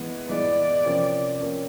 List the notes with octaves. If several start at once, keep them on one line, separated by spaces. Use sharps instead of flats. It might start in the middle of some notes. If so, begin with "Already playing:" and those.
Already playing: E3 G#3 B3
E3 G#3 B3 D5
C3 F3 A#3 C#4
C3 F3 A#3 C#4